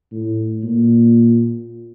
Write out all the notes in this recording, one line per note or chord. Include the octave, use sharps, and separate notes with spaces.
A2
A#2